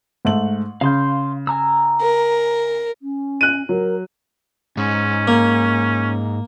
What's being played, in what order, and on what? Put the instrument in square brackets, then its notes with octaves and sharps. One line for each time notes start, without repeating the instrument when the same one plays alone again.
[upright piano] G#2 A3 F#7
[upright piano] C#3 [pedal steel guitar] F5 C6 G6
[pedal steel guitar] G#5 A#5 E6
[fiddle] A#4
[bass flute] C#4
[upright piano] F#6 D#7
[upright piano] F#3 [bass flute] A#4
[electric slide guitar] G#2 [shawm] C#4
[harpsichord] A#3